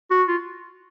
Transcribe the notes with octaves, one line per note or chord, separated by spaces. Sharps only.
F#4
F4